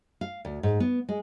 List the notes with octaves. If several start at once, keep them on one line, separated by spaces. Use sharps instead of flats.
F5
D2
G#2
B3
G#3